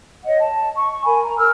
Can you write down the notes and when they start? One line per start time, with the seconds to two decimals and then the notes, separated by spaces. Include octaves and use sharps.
0.25 C#5 D#5 F#5
0.40 A5
0.75 C#6
1.04 A#4 G#5 B5
1.22 A#5
1.37 A#4 E6 F6